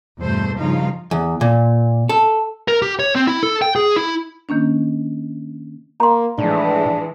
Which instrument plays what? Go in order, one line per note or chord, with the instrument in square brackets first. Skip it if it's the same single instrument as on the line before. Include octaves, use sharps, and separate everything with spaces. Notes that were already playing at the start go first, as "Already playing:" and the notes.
[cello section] E2 G2 B2 A3 A4 C5
G2 C#3 F3 D#4 F4 F5
[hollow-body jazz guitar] E2
A#2
A4
[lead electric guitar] A#4
G4
C#5
C4
E4
A4
G5
G#4
E4
[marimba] D#3 A#3 C#4 D4
[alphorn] A#3 [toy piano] A#5 C6
[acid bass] A2 [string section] E3 F3 G#3 [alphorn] D4